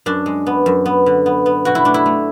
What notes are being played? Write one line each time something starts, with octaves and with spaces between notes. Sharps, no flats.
F#2 D4
G#3
B3
F#2
B3
D3
B3
B3
B2 F#4
E4
A3 D4
E4
A3